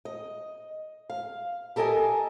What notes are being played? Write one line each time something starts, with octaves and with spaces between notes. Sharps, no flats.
D#5
F5
G4 A4 A#4 D#5 G#5